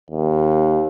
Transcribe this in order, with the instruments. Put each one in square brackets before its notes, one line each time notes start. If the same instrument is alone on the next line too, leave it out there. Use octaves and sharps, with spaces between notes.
[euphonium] D#2